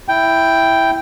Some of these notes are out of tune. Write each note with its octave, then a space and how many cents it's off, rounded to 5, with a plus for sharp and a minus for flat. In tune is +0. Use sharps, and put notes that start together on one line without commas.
E4 +0 G5 +0